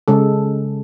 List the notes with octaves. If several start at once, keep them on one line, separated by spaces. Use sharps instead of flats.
C#3 G#3 A4